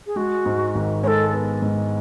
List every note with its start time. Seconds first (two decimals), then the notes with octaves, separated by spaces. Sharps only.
0.06 G#4
0.16 G#3 F#4
0.46 G#2
0.75 G#1
1.03 G#3 A4 C#5
1.32 B3
1.62 G#2